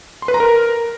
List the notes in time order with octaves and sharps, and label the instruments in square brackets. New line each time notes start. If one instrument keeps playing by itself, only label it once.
[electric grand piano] C6
B4
A#5
A#4